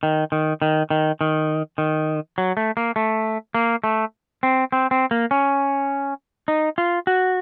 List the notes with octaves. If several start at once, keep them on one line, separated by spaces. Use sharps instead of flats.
D#3
D#3
D#3
D#3
D#3
D#3
F#3
A3
A#3
A3
A#3
A3
C4
C4
C4
A#3
C#4
D#4
F4
F#4